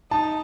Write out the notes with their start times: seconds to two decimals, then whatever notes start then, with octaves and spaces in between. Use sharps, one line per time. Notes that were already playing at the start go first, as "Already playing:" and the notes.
0.11 D#4 A5